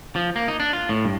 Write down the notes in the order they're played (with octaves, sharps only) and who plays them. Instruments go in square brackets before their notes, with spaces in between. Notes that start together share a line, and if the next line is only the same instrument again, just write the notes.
[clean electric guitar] F3
A#3
D#4
D4
F4
A2
G2